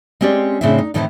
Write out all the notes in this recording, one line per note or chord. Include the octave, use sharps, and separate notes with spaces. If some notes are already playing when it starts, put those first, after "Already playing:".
G#3 C4 C#4 G4 D5
A2 C#3 C4 D4 E4 E5
D#4
A2 D#3 E3 A3 C4 E4